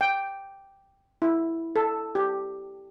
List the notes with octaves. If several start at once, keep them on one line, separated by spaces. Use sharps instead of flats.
G5
E4
A4
G4